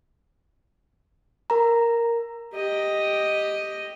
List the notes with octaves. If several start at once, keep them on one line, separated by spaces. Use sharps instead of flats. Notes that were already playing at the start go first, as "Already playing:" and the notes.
A#4 A#5
G4 D#5